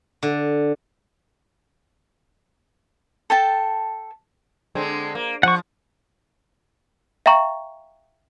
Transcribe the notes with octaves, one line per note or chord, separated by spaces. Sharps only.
D3
A4 G5 A5
D3 G#3 C4
A#3
F3 F#5 C#6
E5 F5 G5 A#5 C#6